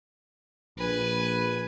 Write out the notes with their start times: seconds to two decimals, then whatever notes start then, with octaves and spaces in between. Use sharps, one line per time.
0.78 A#1 B4 G#5